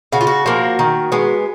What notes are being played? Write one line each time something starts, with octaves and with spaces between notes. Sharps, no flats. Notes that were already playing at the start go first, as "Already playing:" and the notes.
C#3 F#4
F4
F#4
F3 A#3
D#3
G#3 B3